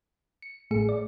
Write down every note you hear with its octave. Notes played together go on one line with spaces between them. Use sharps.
C#7
A1 A2 A3 G#4 C#7
D5